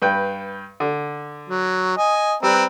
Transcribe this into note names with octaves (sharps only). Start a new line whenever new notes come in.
G2 B4 G5
D3
F#3
D#5 G#5
G3 C4 B4 A#5